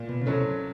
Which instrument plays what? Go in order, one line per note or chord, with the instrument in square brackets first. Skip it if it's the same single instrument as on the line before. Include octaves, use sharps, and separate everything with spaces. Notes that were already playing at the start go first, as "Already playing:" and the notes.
Already playing: [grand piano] A#2
[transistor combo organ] B2
C#3
[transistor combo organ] C3 [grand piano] F#3 A3 C#4 E4